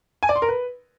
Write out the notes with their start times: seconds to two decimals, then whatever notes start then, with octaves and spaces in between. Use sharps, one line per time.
0.23 G#5
0.29 D5
0.36 C6
0.42 A#4
0.49 B4